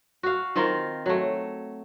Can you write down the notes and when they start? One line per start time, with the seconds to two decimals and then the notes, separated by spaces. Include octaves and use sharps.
0.23 F#4 F5
0.56 D#3 C4 F4 A#4
1.06 F#3 A3